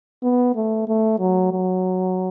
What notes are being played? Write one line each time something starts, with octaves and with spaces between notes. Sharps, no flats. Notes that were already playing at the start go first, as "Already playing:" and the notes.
B3
A3
A3
F#3
F#3